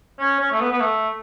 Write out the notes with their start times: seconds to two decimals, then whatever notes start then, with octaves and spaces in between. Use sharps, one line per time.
0.19 C#4
0.39 C#4
0.52 A3
0.60 B3
0.71 B3
0.80 A3